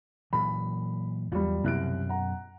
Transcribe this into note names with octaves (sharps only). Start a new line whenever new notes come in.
A#2 E3 F#3 B5
E2 F#3 G3 F4
C2 F#2 B2 F#6 D7
F#5 A#5